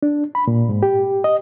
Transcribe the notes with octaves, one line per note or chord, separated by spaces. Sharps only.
D4
B5
A#2
G#2
G4
D#5